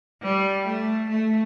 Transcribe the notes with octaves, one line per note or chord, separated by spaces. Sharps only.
G3
A3
A3